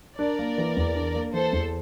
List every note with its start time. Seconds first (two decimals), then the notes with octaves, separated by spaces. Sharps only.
0.19 D4 A#4 D5
0.39 A#3
0.58 E3
0.77 E2
0.95 D4
1.15 A#3
1.33 E3 A4 C5
1.53 E2